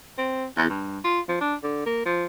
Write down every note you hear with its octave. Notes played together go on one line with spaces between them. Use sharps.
C4
E2
G2
F4
F3
D4
D3
A#3
F3